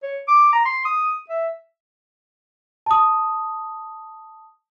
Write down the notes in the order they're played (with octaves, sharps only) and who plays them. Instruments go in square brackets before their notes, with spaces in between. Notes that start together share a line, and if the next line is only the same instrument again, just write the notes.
[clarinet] C#5
D6
A#5
C6
D#6
E5
[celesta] A5 D#6